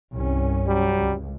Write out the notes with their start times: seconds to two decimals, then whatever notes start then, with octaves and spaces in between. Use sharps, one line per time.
0.15 C2 G2 C#4
0.65 F#3 G3
0.98 C#2